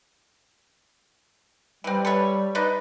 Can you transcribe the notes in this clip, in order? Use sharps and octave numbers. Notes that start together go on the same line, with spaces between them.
E3 G3 C4
A4 B4 C#5
D4 D#4 B4